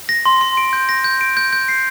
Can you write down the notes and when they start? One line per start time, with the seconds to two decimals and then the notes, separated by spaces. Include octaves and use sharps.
0.09 A#6
0.26 C6
0.41 C6
0.57 D7
0.73 G6
0.89 A#6
1.04 G6
1.21 D7
1.37 G6
1.53 G6
1.68 C7